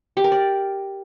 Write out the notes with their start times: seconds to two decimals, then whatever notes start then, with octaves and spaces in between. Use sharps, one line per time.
0.17 G4
0.24 A#4
0.32 D5